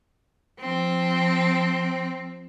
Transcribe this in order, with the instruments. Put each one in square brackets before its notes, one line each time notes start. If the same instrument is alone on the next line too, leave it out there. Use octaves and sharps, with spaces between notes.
[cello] F3 C4